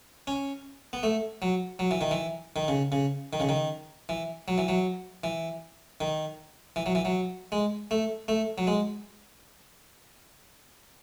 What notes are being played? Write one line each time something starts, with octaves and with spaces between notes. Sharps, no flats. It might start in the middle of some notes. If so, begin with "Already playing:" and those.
C#4
B3
A3
F#3
F#3
E3
D#3
E3
D#3
C#3
C#3
D#3
C#3
D#3
E3
F#3
E3
F#3
E3
D#3
E3
F#3
E3
F#3
G#3
A3
A3
F#3
G#3